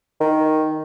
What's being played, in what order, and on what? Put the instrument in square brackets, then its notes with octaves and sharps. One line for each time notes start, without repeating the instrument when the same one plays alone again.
[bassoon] D#3